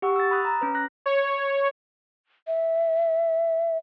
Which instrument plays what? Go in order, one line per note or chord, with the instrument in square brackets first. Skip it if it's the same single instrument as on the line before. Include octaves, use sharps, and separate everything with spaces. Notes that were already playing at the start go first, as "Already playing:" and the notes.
[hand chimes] G4 F#5 C#6 E6
E6 A6
B5 D#6 F#6
A#5
C#4 B4
F#6 A#6
[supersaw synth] C#5
[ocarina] E5